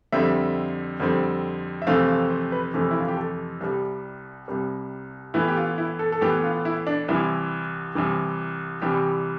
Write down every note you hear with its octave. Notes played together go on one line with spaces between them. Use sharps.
F2 D3 G3 C4 E5
F2 D3 G3 C4
E5
F2 C3 E3 A3 C4 F5
F5
C5
B4
F2 C3 E3 A3 C4
E4
F4
G4
A4
C2 C3 G3
C2 C3 G3
A2 E3 B3 E4
G4
F4
E4
A4
A4
A2 E3 B3 G4
F4
E4
D4
C2 C3 E3 E4
C2 C3 E3
C2 C3 E3 G3 G4